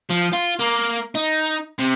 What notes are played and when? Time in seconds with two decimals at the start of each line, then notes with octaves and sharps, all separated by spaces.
0.10 F3
0.33 F4
0.60 A#3
1.15 D#4
1.79 C3